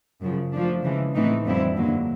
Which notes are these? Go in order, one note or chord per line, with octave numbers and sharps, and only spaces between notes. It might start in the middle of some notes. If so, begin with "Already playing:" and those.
F#2 C#3 F3
F3 A3 D4
C#3 E3 G#3
A2 E3 A3 C4 D#4
F2 D3 G3 C4 E4
G2 D3 F#3 A#3